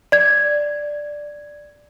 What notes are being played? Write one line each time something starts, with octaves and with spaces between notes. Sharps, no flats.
D5 G#6